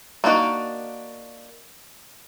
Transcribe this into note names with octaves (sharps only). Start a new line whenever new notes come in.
A#3 D4 D#4 F#4